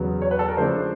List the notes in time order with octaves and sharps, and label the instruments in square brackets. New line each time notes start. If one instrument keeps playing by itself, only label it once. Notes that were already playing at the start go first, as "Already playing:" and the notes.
Already playing: [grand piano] E2 C#3 F#3 B3
C#5
B4
A4
A#4
C#3 F3 A3 D4 C5